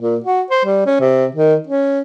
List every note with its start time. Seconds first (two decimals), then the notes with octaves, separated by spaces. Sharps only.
0.01 A#2
0.24 F#4
0.51 C5
0.65 G3
0.86 C#4
1.01 C3
1.35 D#3
1.67 C#4